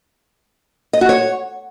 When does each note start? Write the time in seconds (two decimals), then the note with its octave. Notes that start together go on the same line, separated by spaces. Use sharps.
0.93 D#5
1.01 F#4
1.09 C#5